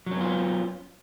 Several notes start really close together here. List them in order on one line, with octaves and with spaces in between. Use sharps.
F#3 C#4 B3 F4